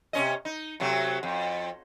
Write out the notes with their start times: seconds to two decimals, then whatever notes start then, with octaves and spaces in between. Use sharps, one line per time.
0.13 C3 C#4 D#5
0.45 D#4
0.80 C3 F#3 A3
1.23 F2